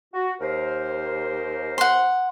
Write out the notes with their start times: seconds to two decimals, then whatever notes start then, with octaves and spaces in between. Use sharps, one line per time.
0.14 F#4
0.40 D#2 A#4 C5
1.78 F#5 C6